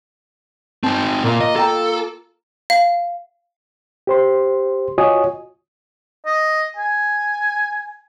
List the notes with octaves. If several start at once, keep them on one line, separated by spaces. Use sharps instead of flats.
C4 D#4 A5
A#2 A#3 F4 F5
D#5
A4 F5 G5 A#5
F5
G4 C5 C6
F4 F#4 C#5 D#5 G#5 D#6
D#5
G#5